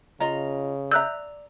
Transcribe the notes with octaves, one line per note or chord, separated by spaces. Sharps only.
C#3 F4 D#5 A#5
D5 E5 A#5 E6 F#6 G6